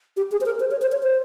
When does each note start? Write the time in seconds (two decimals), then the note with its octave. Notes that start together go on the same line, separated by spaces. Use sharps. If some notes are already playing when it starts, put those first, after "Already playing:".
0.17 G4
0.32 G#4
0.41 C5
0.46 A#4
0.60 C5
0.71 C#5
0.82 C5
0.92 C#5
1.03 C5